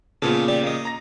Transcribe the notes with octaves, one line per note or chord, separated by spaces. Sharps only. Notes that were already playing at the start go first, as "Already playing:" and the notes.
A#2 C#3 B3 F4 A4
G3 G4 D5
A#3 D#5
A#5 A#6